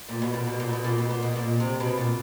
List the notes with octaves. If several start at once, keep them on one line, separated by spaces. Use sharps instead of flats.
A#2
B2
A#2
B2
A#2
B2
A#2
B2
A#2
B2
A#2
C3
B2
A#2